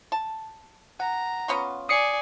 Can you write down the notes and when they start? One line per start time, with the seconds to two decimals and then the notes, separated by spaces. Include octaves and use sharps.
0.12 A5
1.00 F#5 A#5
1.48 B3 C#4 F4
1.89 D5 G#5 D#6 C7 C#7